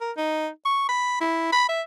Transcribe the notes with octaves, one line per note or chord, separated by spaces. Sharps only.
A#4
D#4
C#6
B5
E4
B5
E5